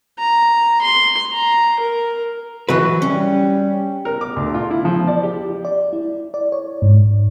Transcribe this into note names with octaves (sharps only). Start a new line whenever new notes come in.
A#5
C6
A#5
A#4
E3 F#3 B4
G3 C#4
A#4
D6
D2
F4
E4
F3
D5
G4
D5
E4
D5
C#5
G#2